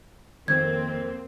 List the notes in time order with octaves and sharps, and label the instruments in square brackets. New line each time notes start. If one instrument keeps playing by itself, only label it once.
[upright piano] F2 [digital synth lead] D#3 [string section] A#3 C4 [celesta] G#6